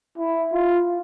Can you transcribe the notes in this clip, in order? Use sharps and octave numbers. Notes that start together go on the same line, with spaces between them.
E4
F4